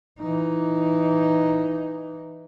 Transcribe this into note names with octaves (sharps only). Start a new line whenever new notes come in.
E3 D#4